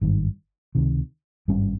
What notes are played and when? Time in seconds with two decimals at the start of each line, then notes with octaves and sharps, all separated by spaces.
0.01 G#1 G2 D#3
0.75 C#2 C3 D#3
1.48 G#1 G2 G3 C#4